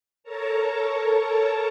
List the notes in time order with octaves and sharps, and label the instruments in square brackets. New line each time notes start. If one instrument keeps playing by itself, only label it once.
[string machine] A4 A#4 C#5 A5 A#5